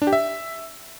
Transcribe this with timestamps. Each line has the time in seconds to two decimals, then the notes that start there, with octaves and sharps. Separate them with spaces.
0.02 D4
0.07 G4
0.13 E5